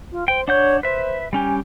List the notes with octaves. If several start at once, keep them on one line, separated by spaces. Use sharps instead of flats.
F4
C5 G5
D4 C#5 F#5 G6
B4 C5 E5
G3 C#4 G4 G#5